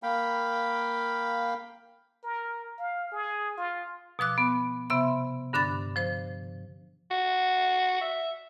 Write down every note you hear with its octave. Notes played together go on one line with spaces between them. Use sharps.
A#3 F5 G5 B5
A#4
F5
G#4
F4
B2 F3 D6 F#6
B3
C3 B3 E5 C6
G2 D3 D4 B5 A6
F3 C5
F#4
E5